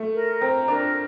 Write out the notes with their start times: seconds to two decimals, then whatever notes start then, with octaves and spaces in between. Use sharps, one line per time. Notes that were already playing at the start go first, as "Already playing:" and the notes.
Already playing: A3
0.15 A#4
0.41 C4 A#5
0.68 D4 A#4